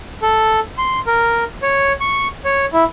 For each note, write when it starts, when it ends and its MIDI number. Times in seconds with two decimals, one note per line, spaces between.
0.22 0.60 69
0.78 0.99 84
1.07 1.44 70
1.62 1.93 73
2.01 2.27 85
2.45 2.66 73
2.73 2.84 64